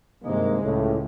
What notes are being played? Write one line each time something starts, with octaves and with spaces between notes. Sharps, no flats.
G2 C3 D#3 G#3 A#3
C#2 A2